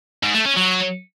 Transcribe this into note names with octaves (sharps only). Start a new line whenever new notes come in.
G#2
A3
C#4
F#3